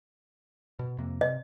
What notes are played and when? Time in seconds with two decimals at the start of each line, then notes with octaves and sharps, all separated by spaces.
0.79 B2
0.98 F2 C3 A#3
1.21 C3 D#5